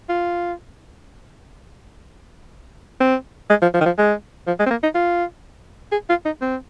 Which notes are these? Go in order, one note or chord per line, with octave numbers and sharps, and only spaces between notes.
F4
C4
G#3
F3
F3
D#3
F3
G#3
F3
G#3
C4
A#3
D#4
F4
G#4
F4
D#4
C4